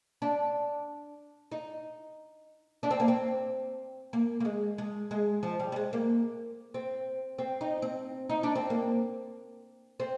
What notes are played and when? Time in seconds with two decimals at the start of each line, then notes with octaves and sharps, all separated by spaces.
0.22 D4
1.52 D#4
2.83 D4
2.91 C4
3.00 A#3
3.08 C4
4.13 A#3
4.40 A#3
4.45 G#3
4.78 G#3
5.11 G#3
5.43 F3
5.60 G3
5.72 G3
5.76 G#3
5.93 A#3
6.74 C4
7.38 C4
7.61 D#4
7.82 C4
8.29 D#4
8.43 D4
8.55 C4
8.70 A#3
10.00 C4